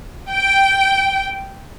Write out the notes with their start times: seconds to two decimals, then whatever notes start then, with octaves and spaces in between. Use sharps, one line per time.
0.31 G5